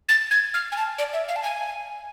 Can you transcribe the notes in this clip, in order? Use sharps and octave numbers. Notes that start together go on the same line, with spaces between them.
A6
G#6
F6
G#5
A5
D5
E5
F5
A5
G#5